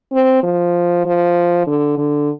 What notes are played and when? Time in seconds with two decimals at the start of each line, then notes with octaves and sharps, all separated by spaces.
0.13 C4
0.43 F3
1.06 F3
1.67 D3
1.97 D3